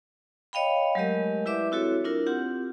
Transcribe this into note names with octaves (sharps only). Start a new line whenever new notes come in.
C#5 D#5 F5 G5 B5
F#3 G#3 A3 G4 A#4 D#5
E4 G4 B4 D5 E5 D6
C4 E4 F#4 A4 C#5
D4 E4 F4 A#4
C4 F4 G4 F#5